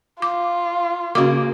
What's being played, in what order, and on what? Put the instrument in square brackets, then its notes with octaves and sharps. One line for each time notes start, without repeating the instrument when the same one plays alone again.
[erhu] F4 [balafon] D6
[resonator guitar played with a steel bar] C#3 A#3 [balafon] F#4 D6